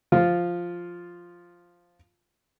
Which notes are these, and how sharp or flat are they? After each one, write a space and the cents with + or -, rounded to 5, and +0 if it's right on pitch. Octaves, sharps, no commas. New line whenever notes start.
F3 +0 F4 +0